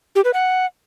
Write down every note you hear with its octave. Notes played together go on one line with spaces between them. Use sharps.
G4
B4
F#5